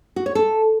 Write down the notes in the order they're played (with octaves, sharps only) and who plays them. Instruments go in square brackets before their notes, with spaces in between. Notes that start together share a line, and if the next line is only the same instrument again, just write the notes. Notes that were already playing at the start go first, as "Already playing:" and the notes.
[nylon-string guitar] F#4
C#5
A4